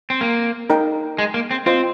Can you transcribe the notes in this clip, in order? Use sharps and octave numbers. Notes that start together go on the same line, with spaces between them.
C4
A#3
D#4 A#4 D#5 G5
G#3
A#3
C4
C4 F4 C5 D#5